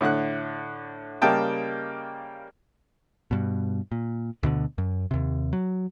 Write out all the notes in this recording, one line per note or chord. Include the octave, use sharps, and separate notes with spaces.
A2 D3 F#5 F#6
C#3 G3 A#3 D#5 G5 A5
G2 B2
A#2
D2 B2 D3
F#2
D#2 C3
F#3